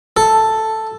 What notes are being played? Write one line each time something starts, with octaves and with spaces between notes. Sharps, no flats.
A4